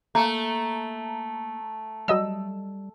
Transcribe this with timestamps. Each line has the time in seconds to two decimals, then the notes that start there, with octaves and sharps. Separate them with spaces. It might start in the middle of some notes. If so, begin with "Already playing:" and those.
0.15 A3 A#3 A#5
2.08 F#3 G3 D#5 E6